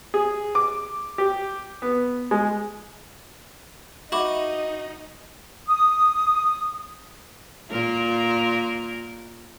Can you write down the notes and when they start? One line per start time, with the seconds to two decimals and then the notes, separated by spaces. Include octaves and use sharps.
0.14 G#4
0.55 D6
1.18 G4
1.82 B3
2.31 G#3
4.12 D#4 F#4 D#5 E5 B5 D6
5.67 D#6
7.71 A#2 A#3 A#4